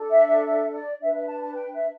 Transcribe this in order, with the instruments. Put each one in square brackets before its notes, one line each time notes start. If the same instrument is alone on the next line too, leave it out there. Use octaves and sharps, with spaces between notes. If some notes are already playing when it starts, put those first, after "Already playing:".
Already playing: [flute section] D4 A4
E5
E5
E5
D5
D4 B4 E5
E5
A5
A5
G5
E5